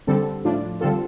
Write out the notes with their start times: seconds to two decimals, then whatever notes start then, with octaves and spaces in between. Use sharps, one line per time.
0.07 D3 G3 C4 A4
0.44 A2 F3 D4 F4 D5
0.81 D3 G3 C4 F4 A4